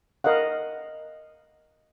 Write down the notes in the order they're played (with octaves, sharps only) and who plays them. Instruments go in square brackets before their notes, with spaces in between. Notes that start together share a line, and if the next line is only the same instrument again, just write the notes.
[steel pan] A#4 D#5 F5 F#5